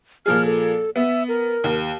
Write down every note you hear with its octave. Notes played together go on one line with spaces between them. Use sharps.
A#2 F3 G#4 F6
A4
B3 E5
A#4
D#2